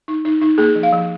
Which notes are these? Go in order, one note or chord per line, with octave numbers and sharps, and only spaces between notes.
D#4
D#4
D#4
A#3 G#4
F3
F5
F3